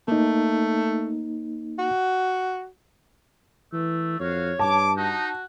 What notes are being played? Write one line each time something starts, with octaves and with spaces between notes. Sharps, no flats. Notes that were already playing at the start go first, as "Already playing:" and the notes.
A3 A#3 D#4
F#4
E3 A3
F2 F#4 C#5 F5
G2 A5 D6
D#4 F#4